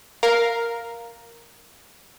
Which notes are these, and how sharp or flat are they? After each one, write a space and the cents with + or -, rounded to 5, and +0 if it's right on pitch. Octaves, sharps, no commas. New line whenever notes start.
A#4 +0 F5 +0